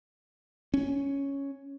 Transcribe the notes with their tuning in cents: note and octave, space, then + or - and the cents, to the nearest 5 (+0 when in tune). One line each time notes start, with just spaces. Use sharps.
C#4 +0